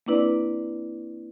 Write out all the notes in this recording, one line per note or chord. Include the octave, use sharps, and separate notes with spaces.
A#3 C4 D4 E4 B4 D5